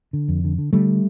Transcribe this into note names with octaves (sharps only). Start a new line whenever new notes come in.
D3
F2
D3
D3
D3 G3 A3